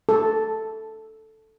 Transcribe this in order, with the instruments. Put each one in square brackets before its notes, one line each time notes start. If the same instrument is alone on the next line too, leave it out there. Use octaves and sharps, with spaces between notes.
[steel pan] A4